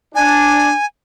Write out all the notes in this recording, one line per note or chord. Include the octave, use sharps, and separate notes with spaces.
D4 G#5